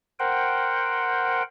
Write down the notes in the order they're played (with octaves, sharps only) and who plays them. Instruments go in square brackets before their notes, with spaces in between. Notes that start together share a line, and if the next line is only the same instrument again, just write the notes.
[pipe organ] A#4 C5 F#5 G5